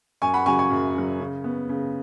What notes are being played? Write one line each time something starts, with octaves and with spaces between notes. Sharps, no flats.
F#2 G#5 C#6
F#5 B5
C#3 F#3 G#5 C#6
G#5 C#6
F#2
C#3 F#3
C#3
B3
C#3